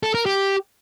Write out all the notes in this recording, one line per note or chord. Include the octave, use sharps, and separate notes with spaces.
A4
A#4
G4